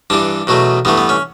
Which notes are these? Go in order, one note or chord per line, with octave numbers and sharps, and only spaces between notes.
G2 E3 G3 D4
E2 B2 F#3 A3
G2 E3 A3 B3
B3
C#4